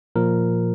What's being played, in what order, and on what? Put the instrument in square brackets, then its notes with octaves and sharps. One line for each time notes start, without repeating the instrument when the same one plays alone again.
[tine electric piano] A#2 F3 A#4